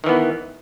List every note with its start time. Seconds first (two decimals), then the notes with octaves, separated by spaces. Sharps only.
0.04 D#3
0.06 E3
0.09 B3